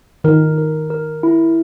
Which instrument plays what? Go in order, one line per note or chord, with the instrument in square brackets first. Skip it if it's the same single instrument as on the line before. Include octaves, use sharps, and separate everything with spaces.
[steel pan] D#3 [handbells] A#4
[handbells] A#4
A#4
E4